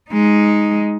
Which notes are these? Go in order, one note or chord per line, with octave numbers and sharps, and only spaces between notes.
G#3 D#4